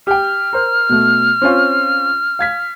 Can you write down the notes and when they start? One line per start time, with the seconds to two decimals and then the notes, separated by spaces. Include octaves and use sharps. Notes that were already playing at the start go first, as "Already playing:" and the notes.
0.07 G4 G5 F6
0.53 A#4 C5
0.89 B2 A3
1.42 C4 C#4 F4
2.39 F5 G#6 B6